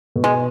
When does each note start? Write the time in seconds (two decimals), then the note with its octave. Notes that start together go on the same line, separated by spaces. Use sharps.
0.16 B2
0.24 G#3